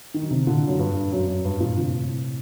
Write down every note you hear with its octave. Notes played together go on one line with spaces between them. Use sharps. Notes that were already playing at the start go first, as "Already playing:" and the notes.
D#3
F#3
C3 D#3
A#2 D3
F#2
G2
F#2
F#2
G2
G2 A#2
A2 C3